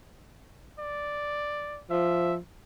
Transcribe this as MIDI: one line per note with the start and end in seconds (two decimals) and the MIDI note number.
0.79 1.81 74
1.91 2.37 53
1.91 2.35 76